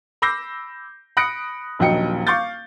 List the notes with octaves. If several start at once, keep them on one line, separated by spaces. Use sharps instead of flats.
B5 D6 E6 G6 A#6 C7
B5 D#6 F#6 A#6 C#7 D7
D#1 A#1 F#3 D#5 G5 C#7
F5 C#6 D6 G6 A6